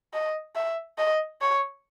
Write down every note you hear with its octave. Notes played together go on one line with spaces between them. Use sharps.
D#5
E5
D#5
C#5